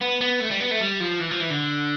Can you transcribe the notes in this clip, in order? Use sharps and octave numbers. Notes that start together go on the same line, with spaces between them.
B3
B3
A3
G3
B3
A3
G3
F3
E3
F3
E3
D3